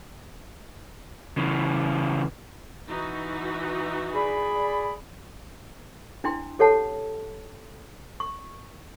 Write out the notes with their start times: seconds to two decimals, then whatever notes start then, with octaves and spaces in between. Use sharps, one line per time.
1.38 C#3 E3
2.88 E3 D#4 F#4
4.14 G#4 D5 B5
6.24 D4 E4 G5 C6
6.59 G4 A4 C#5 F#5 A5
8.20 C#6